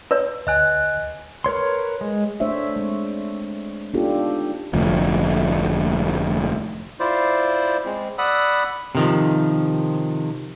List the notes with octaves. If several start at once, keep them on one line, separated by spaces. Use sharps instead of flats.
B4 C#5
D2 D#5 G#5 F#6
A#4 B4 C#5 C6
G#3
A3 D4 C5 C#5 E5
G#3 C4
B3 D4 D#4 F4 G4 A4
F1 D2 F3
E4 F4 C5 D5
G#3 C4
D5 F#5 B5 D#6 E6
C3 D#3 F3